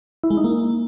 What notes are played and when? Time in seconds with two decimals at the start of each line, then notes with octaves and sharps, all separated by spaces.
0.23 E4
0.30 G#3
0.37 D#4
0.44 A#3